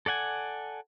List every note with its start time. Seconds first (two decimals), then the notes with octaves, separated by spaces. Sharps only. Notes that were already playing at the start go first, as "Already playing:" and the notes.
0.06 A4 D5 F#5 G#5